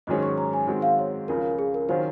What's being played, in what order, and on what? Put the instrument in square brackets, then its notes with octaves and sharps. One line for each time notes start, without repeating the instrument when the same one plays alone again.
[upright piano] G#2 D#3 F#3 C#4 G#4 [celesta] D#5
[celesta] C#6
A#5
G#5
[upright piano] D#3 G#3 C4 F#4
[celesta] F5
C#5
[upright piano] C#2 C#3 F3 [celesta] A#4
[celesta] A#4
G#4
A#4
[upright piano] D#3 F#3 C#4 F4 [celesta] C5